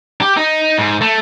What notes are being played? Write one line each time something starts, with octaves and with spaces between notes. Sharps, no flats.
G4
D#4
G#2
A3